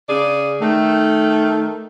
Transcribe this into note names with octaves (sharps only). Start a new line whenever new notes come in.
C#3 G#4 D5
D#3 A3